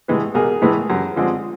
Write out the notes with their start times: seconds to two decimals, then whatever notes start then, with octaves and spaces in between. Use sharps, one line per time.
0.08 A2 E3 G#3 B3
0.34 B1 G#4 A#4
0.62 A2 E3 G#3 B3
0.90 F#2
1.16 D3 F3 G#3 C4